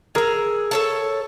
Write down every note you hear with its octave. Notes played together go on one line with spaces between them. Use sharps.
G#4 A#4 A#5 E6
A4 C#5 A5